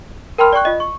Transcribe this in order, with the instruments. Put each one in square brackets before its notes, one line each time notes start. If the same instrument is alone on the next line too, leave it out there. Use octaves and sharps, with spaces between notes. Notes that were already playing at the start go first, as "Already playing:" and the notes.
[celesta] A#4 G5 A5 B5 C6 F6
D5 G5 C#6 F#6
F4 D#5
C#6